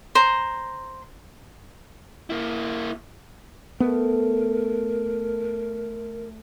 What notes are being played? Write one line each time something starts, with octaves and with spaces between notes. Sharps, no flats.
C5 A#5
A#3 E4
A3 B3 A#4